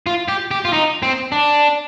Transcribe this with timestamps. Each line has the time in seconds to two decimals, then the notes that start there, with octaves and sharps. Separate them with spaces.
0.07 F4
0.28 G4
0.51 G4
0.65 F4
0.73 D#4
1.03 C4
1.32 D4